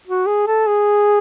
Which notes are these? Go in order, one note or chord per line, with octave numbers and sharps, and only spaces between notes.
F#4
G#4
A4
G#4